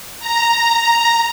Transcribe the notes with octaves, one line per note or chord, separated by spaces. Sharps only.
A#5